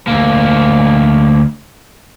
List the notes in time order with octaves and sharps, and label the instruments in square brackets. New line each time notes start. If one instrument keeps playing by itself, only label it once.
[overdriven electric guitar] D2 A#3